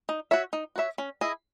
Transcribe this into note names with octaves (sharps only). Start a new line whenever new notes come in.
D#4
F#4 C#5 E5
D#4
F#4 C#5 E5
C#4
E4 G#4 D#5